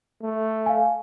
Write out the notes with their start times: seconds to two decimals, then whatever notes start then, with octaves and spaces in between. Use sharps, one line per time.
0.23 A3
0.66 F5 G#5